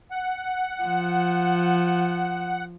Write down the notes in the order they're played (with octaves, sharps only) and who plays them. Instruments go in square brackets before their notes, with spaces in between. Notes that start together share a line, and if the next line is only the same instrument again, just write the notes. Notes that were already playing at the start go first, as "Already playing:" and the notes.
[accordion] F#5
[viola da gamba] F3